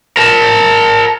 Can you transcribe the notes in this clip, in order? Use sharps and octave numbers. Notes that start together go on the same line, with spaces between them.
A#4 A5